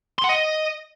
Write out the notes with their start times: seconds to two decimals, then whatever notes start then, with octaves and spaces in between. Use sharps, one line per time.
0.19 C6
0.24 F#5
0.29 D#5